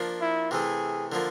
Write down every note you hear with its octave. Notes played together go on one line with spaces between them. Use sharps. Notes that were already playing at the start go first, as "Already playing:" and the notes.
Already playing: F3 A#3 D4
E4
C3 E3 A3 G#4
D3 F3 A#3